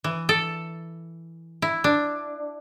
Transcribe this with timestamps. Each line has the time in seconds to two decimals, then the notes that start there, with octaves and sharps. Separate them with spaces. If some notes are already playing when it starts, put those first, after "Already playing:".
0.04 E3
0.29 A4
1.62 E4
1.84 D4